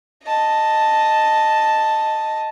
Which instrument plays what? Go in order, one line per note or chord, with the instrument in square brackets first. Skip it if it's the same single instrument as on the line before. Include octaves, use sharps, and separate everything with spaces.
[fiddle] D#5 A5